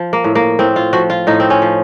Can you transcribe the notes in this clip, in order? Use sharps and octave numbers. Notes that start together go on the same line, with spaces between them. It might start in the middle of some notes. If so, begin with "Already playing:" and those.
Already playing: F3
A#3
A2
A#3
A2 C4
F4
F3 F#4
F4
A2 D#4
C4
C#4
F3